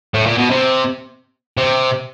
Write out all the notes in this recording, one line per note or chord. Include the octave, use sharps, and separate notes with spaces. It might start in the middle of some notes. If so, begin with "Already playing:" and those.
A2
A#2
B2
C3
C3